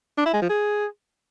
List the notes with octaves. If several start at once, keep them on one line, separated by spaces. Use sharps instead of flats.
D4
E4
G#3
F3
G#4